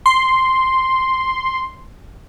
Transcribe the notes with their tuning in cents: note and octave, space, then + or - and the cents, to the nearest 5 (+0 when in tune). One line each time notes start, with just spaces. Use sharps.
C6 +0